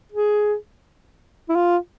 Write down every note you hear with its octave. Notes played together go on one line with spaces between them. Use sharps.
G#4
E4
F4